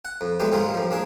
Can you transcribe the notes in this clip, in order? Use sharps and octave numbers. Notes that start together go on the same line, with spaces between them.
F#5
F2
F#3 G#3 A3 B3 G4
G#2 D#3 G3 G#3 D#4 F4
F#2 F3
A#3 D4 G#4